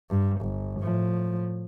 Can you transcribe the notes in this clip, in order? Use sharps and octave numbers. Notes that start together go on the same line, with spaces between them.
G2
G1
A2 F3